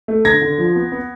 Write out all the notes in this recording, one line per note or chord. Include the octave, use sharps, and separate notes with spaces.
A3
D3 G#6 A#6
D3
F3
B3
B3